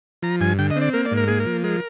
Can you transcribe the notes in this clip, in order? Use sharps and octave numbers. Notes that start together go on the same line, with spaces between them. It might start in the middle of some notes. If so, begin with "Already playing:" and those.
F3 A#5
G2 G#5
D3 G5
D#5
C4
D5
A#3 A#4
D5
G#2
A#4
A#3 G#4
A#4
F3
G#3 A#4